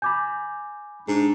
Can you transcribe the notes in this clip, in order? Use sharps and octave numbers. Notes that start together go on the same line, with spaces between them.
G#5 B5 D6 G6
G#2 D4 G#4